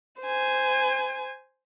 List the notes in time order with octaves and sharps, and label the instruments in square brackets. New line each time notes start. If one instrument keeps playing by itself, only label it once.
[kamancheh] C5 G#5